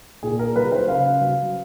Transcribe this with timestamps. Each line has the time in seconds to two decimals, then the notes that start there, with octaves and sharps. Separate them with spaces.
0.23 A#2 G#4
0.39 A#4
0.56 F#3 B4
0.72 C5
0.88 C#3 F5
1.21 F#3